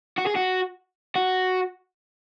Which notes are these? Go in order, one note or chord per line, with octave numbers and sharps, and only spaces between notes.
F#4
G#4
F#4
F#4